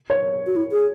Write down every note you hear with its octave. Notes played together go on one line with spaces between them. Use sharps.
C#5
F#4
E4
G#4